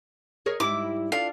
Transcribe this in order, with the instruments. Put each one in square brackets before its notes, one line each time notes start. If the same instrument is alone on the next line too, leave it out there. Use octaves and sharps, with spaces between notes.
[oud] G#4 A#4 C#5
[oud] G#2 G3 E4 [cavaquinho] D6
[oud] D4 F4 A4 [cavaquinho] F5